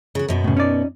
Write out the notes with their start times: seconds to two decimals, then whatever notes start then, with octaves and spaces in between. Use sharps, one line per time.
0.15 C#3 F#4
0.28 F#2 B2 B3
0.44 A2 C#3
0.57 C#4 D#4 D5